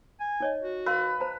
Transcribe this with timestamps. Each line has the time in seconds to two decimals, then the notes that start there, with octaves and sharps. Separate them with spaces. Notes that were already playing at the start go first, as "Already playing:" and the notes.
0.20 G#5
0.40 D#4 C#5 D#5
0.62 F#4
0.86 A#4 B4 F5 C6
1.20 C5 A5 A#5